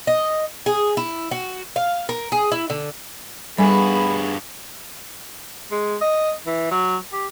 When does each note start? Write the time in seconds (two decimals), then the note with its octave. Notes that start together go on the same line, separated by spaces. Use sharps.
0.07 D#5
0.66 G#4
0.97 E4
1.31 F#4
1.76 F5
2.09 A#4
2.32 G#4
2.52 E4
2.70 D3
3.58 G2 G3 B3 F#4 G#4 A4 G#5 B5
5.71 G#3
6.01 D#5
6.46 E3
6.71 F#3
7.13 G4